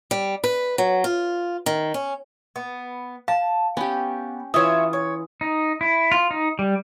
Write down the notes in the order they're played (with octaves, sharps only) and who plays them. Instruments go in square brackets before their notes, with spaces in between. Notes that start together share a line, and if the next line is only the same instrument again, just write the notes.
[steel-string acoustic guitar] G3
B4
F#3
F4
D#3
C#4
[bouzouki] B3
[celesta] F5 [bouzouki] A5
[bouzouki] B3 [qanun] C#4 G4
[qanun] E3 F4 [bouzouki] C#5 E5 [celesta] D#6
[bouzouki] C#5
[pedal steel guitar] D#4
E4
F4
D#4
G3